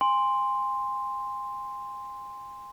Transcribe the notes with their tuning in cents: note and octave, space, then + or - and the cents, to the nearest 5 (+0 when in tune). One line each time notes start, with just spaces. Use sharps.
G#5 -30 C6 +0